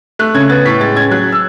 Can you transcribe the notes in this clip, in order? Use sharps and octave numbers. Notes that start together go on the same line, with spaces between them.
A3 F#6
C#3 G#6
B3 A6
A2 B6
G#3 A6
C#4 G#6
F#3 F#6
E6